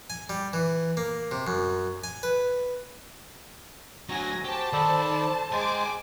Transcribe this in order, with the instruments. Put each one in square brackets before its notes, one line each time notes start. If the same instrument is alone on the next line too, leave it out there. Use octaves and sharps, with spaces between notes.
[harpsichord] G#5
G3
E3
A#3
C3
F#2
G#5
B4
[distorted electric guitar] D2 F#3 [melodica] F#4 [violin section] G#5 A#6
[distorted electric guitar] G4 G5 [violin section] C5 A5
[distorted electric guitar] D#3 [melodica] A4 D5 B5
[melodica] G#3 C5 [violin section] G#4 D6 [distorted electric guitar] G#5 A5